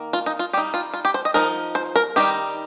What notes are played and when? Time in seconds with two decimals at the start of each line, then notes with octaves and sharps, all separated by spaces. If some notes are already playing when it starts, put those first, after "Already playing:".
Already playing: D#3 A#3
0.13 F4
0.26 D#4
0.39 F4
0.53 G3 D#4 G4
0.74 F4
0.94 F4
1.05 G4
1.14 C5
1.25 D#5
1.34 F3 C4 D#4 A#4
1.75 C5
1.96 A#4
2.16 D#3 G3 D#4 G4